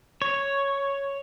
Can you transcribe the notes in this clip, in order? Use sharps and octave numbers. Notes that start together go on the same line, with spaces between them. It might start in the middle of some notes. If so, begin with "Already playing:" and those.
C#5